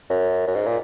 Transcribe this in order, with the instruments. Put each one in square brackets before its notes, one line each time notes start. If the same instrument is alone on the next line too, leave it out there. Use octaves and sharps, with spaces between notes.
[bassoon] F#2
F#2
G#2
A#2